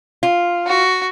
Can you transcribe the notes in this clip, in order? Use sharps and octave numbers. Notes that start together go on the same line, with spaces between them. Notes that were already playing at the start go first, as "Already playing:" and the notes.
F4
F#4